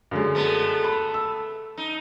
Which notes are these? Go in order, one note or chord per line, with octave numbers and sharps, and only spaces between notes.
F#2 D3 G#3
A3 B3
B5
E6
D#4